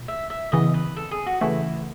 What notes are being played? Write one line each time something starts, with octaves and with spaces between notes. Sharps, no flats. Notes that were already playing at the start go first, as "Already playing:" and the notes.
Already playing: C#2 B2
E5
E5
C#3 E3 B3 D#5
B4
A4
G#4
F#4
C#3 E3 A3 E4